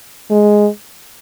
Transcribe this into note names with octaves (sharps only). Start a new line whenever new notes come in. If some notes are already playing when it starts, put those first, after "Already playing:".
G#3